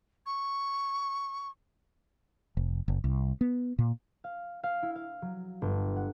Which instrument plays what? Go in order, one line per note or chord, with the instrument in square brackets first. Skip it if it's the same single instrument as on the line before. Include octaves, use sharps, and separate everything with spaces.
[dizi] C#6
[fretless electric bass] F1
F#1
C2
B3
A#2
[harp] F5
F5
E4
F5
F#3
G1
F#5